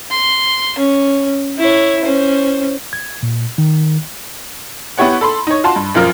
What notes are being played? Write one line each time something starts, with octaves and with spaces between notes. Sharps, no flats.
C6
C#4
E4 C#5
C#4 C5
G#6
A#2
D#3
B3 E4 G4 C#5 F#5
A4 B5 C6
D#4 C#5
F4 F#4 A5 C6
G2
A1 F#2 F3 F4 A#4 F6